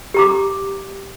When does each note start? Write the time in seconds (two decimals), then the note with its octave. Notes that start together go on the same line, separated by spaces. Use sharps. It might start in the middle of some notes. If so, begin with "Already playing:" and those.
0.14 G4 A#5 D6